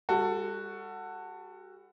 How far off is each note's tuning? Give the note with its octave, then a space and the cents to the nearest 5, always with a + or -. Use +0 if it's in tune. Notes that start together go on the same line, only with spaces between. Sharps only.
G3 +40 F#4 +0 A4 +20